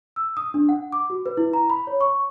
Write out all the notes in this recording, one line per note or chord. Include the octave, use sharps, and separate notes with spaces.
E6
D#6
D4
F#5
D6
F#4
B4
E4
A#5
B5
C#5
C#6